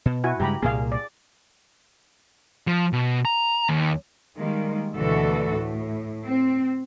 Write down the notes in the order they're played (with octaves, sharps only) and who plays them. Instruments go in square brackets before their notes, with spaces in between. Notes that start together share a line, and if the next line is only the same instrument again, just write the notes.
[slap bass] B2
[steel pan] E4 F#4 G#5
[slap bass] G2 C#3 G#3 [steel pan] G4 A#5 B5
[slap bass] C2 A#2 A#3 [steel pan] G#4 F5
[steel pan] D5
[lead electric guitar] F3
B2
A#5
D#2
[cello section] D#3 G3 G#3 A#3
D2 B2 D3 E3 F#4 A4
A2
C4